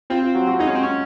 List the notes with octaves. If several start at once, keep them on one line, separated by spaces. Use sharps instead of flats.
C4 F4
F4
F#3 F#4
F#3 F#4
G#3 D#4 G#4
C#4
C4
C#4